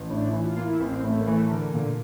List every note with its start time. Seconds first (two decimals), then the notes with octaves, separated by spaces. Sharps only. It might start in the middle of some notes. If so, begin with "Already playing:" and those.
Already playing: A1
0.10 A2 D4
0.28 E4
0.33 E3
0.41 E4
0.45 F4
0.57 A#3
0.63 E4
0.80 A1 C4
1.04 A2 A3
1.19 A#3
1.27 E3 A3
1.50 D3 A#4
1.74 A#2 D3